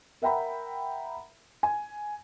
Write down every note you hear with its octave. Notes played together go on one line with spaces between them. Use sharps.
A#4 E5 F#5 G5 A#5 B5
G#5